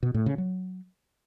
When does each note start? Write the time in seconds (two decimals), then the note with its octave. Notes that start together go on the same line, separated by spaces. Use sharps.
0.03 B2
0.14 A2
0.26 C#3
0.38 F#3